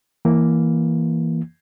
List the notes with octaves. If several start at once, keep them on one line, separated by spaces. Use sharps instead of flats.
E3 A#3